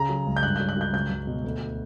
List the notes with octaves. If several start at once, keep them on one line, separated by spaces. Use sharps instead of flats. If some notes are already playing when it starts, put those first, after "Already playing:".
Already playing: C#3 A#5
F#3
C#2
G6
G2 F#6
F#3 G6
F#6
F#3 G6
C#2 G6
C#2
B2
D2